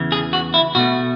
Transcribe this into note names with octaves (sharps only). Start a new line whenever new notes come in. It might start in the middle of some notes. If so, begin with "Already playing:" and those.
Already playing: E2 C#3 E3
G#4
F#4
E4
B2 A3 F#4